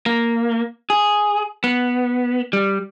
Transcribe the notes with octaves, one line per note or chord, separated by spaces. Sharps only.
A#3
G#4
B3
G3